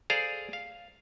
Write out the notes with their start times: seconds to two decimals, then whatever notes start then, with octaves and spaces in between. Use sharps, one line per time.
0.10 G#4 A4 C5 D5 F5 A#5
0.53 F5